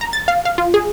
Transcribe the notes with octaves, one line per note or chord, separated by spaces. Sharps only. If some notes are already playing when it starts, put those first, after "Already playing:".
A#5
A6
F5
F5
F4
G#4